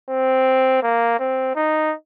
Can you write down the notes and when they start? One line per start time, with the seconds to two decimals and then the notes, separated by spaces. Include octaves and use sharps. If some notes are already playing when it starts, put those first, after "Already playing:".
0.10 C4
0.83 A#3
1.19 C4
1.55 D#4